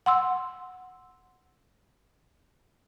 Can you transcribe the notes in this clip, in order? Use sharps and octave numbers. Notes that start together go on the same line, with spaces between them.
F#5 C6 E6